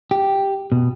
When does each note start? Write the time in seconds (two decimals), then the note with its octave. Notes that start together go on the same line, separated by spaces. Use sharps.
0.11 G4
0.72 B2